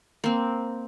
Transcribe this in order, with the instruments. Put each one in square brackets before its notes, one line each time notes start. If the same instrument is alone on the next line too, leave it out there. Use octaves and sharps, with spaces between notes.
[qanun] A#3 C4